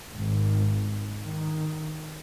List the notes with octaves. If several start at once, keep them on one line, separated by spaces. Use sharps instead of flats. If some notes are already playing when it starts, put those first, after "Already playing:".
G#1
D#3